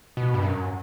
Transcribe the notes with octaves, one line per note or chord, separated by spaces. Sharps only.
B2
G2
F#2